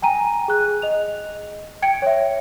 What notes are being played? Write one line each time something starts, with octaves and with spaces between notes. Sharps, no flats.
G5 G#5 A#5 D#7
G#4 F#6
D#5 F7
G5 G#6 C#7 D7
C#5 E5